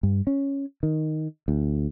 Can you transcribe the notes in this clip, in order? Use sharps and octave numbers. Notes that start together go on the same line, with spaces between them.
G2
C#4
D#3
D2